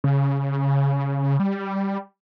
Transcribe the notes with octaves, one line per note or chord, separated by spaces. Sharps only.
C#3
G3